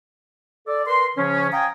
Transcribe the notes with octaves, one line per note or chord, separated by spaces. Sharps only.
A4 D5
A#4 B4 C6
C#3 F3 C#4
F5 G5 G#5 A#5 D#6